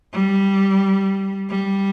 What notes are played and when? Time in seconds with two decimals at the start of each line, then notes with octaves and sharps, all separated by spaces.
0.13 G3
1.50 G3